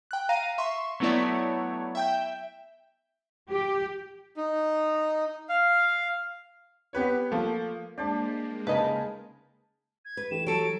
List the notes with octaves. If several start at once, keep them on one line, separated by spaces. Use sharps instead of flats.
G5 F#6
F5 A#5 A#6 D#7
E5 C6 C#6
F#3 A3 B3 E4 C#5 D5
E5 G5 G6
G4
D#4
F5
B3 G4 B4 C#5
F3 A3 A#3
G#3 A#3 D4 G4 C5 A5
C#3 D#4 A#4 B4 D#5 G#5 A5 B5
G#6
B4
E3 A3 G4 E7
F#3 A4 D7